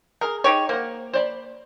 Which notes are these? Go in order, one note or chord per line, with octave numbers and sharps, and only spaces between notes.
G#4 A#4
D#4 G4 C#5
A#3 C5 F#5
C5 D5 B5